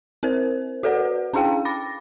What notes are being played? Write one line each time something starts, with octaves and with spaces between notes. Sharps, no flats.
C4 A#4 C5
F#4 A4 B4 D5 F#5
C#4 D4 E4 G#4 F5 G5
B5 D6 A6 A#6